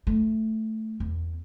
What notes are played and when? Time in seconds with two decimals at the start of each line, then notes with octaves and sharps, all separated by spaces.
0.07 A3
1.00 E2